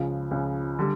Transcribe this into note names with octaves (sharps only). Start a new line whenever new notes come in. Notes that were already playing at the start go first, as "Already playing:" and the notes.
Already playing: C#2 C#3 F3
C#2 C#3 F3
D3 G3